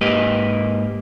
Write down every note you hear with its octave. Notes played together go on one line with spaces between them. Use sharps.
G#2 A#3 G4 B4 D#5